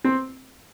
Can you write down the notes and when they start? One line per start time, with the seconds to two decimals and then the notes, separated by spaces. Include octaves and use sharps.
0.04 C4